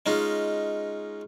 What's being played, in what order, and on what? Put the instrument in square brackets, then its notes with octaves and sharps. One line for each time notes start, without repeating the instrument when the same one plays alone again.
[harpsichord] G#3 C#4 D#4 F4